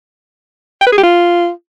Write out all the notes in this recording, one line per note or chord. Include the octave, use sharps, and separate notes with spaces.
G5
B4
G#4
G4
F4